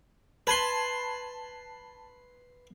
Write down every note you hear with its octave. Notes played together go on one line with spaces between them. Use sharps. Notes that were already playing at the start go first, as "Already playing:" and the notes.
B4 A5 B5 C6 G#6